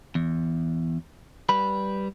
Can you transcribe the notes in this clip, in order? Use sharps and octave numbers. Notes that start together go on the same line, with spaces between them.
E2
G3 B4 B5